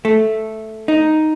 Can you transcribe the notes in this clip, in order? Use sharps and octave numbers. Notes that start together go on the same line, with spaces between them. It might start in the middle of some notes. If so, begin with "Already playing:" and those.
A3
D#4